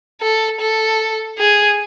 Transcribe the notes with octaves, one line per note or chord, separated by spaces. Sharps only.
A4
A4
G#4